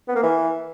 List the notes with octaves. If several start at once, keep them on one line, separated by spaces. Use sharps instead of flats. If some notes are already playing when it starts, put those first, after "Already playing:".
B3
A#3
E3